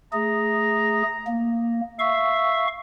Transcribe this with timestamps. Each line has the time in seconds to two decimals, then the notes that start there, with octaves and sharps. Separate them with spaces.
0.13 A3 G#4 A#5
1.27 A#3
1.99 E5 F5 C#6